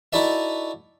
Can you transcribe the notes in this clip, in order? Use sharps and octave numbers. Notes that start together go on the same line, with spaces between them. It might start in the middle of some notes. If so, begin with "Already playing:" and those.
D#4 E4 F#4 A4 D5 E5